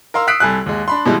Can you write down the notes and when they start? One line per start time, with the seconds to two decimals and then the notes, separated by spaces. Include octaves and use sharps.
0.14 A#4 F5 C6 E6
0.27 D#6 E6 F#6 B6 C7 D7
0.40 C2 A4 G#5 F#6
0.66 D#2 G#3
0.88 D4 B5 C6
1.06 B2 E3 G3 G#3